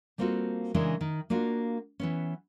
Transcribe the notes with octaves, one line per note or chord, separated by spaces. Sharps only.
G3 A#3 C4 F4 F#4 A4
C#3 E3 G#3 C#4 D4 A#4
D#3
A#3 D4 F4 F#4
E3 B3 C#4